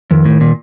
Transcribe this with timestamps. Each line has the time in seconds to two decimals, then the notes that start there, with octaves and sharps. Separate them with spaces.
0.11 F2 D#3
0.25 A2
0.41 A#2